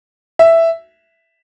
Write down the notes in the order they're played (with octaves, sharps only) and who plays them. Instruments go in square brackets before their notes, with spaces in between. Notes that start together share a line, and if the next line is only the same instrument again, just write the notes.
[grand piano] E5